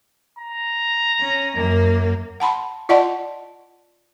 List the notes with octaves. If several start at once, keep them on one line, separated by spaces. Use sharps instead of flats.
A#5
C#4
F#2 A#3
F#5 A5 B5 C6
F4 D5 D#5 F#5 A5 C6